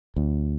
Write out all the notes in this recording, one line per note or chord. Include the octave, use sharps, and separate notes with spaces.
D2